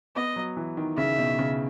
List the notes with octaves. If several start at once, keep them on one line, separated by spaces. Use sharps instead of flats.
B3 D#5
F#3
E3
D#3
C#3 E5
B2
C#3